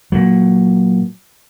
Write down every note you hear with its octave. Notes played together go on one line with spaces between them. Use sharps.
A#2 F#3